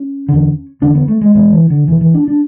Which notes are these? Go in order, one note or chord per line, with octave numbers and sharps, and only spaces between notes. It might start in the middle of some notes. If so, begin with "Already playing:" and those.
Already playing: C#4
E2 D3
E2 D3 D4
B3
A3
G#3
E2 B2 G#3
E3
D3
E2 B2 E3
E3
D4
D4